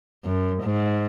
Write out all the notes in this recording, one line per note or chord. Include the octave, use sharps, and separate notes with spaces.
F#2
G#2